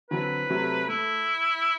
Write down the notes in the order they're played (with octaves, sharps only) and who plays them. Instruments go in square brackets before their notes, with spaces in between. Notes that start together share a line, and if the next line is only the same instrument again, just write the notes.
[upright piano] D3 F#3 C4 E4 [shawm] B4
[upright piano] C3 F#3 A3
[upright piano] A3 [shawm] E4